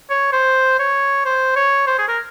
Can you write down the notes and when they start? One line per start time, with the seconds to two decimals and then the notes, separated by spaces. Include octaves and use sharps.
0.10 C#5
0.33 C5
0.80 C#5
1.26 C5
1.56 C#5
1.87 C5
1.99 G#4
2.08 A#4